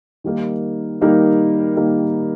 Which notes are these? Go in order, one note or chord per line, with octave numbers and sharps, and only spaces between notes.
D#3 G3 A#3 D#4 A#4
D#3 G3 A#3 D#4 A#4
D#3 G3 A#3 D#4 A#4